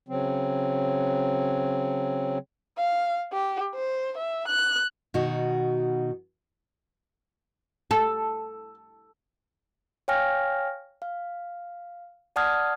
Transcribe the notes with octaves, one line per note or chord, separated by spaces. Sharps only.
C#3 F#3 C4
F5
G4
C5
E5
F#6
B2 D#3 D#4 F#4
A4
C#5 F5 G5 G#5 F6 A#6
F5
D5 F#5 A5 D#6 F6 G#6